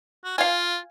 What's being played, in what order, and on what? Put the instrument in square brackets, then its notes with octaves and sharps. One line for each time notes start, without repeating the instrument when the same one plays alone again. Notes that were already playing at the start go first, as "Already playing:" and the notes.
[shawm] F#4
[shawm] F4 [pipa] F5 G#5